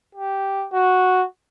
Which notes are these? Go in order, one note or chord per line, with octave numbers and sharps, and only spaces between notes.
G4
F#4